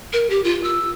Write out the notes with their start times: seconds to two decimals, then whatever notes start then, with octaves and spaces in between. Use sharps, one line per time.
0.13 A#4
0.30 G4
0.44 F4
0.64 E6